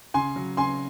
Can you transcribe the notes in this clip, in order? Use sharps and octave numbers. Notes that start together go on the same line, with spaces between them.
C#3 G#5 C6
F#3
C#3 G#5 C6